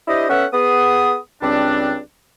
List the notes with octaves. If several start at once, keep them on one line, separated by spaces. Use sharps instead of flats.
D4 E4 G4 C5 D#5
B3 C#4 A4 B4 E5 F#5
B3 G#4 D#6
C#2 G3 C4 D4